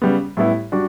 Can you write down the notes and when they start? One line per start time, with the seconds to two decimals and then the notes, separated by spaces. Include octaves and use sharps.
0.02 C#3 G3 B3
0.37 A2 G3 B3 E4 G4
0.72 G3 D4 F#4